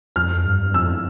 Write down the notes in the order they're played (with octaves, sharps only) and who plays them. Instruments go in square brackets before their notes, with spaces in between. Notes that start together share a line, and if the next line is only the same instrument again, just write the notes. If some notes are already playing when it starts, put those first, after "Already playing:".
[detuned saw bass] F2 [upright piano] F6
[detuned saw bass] G2
[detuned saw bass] F2 [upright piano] E6